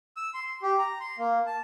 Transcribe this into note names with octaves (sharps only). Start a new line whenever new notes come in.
E6
C6
G4
A#5
C6
A#3
A5